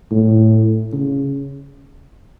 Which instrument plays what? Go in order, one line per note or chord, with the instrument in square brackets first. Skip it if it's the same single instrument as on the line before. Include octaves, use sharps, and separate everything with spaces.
[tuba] A2
C#3